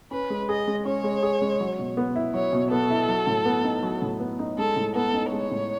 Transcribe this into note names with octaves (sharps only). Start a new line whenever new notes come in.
C#4 B4
G#3
G#4 D#5
G#3
C#4 C#5
G#3
G#4
G#3
F#3
B2
B3
E4
F#3 C#5
B2
B3 A4
E4
F#3
A2
B3
D#4
F#3
A2
B3
D#4
G#3 A4
A2
B3 A4
D#4
G#3 C#5
A2